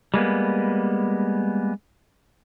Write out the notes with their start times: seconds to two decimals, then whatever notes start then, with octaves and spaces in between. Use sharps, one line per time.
0.14 G3 G#3 A#3 B3